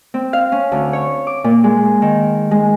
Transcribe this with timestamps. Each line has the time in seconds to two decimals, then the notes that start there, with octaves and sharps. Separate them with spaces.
0.14 C4
0.33 F5
0.52 C#4
0.72 D2
0.93 C#5
1.27 D6
1.44 A#2
1.64 G#3
2.02 D#3
2.51 G#3